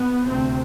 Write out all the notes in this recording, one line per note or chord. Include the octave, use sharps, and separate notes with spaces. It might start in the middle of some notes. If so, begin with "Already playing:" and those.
Already playing: B3
D2 C3 C4